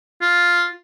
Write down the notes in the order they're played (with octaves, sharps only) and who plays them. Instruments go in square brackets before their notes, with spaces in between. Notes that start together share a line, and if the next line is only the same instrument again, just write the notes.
[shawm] F4